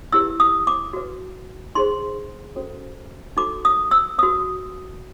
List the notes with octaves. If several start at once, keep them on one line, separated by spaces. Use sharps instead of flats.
E4 G4 B4 E6
D#6
D6
F#4 B4
D#4 G#4 C5 C6
C#4 F#4 A4 C5
D#4 F#4 A4 D6
D#6
E6
F#4 B4 D#6